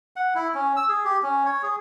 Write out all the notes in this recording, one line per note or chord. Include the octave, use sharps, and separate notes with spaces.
F#5
E4
C#4
E6
G#4
G4
C#4
C#5
G#4